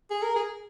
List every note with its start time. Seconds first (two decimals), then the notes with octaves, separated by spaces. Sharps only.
0.11 G#4
0.23 A#4
0.36 G#4